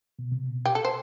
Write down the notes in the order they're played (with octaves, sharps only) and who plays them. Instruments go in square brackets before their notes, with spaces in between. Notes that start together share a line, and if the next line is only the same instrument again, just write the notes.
[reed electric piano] B2
C3
B2
[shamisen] G4
A4
C5